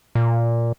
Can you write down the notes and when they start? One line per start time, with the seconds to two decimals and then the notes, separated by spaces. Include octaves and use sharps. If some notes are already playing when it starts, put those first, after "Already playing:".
0.15 A#2